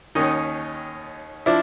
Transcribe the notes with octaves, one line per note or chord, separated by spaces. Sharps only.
D#2 D#3 C#4 D#4
F3 D4 E4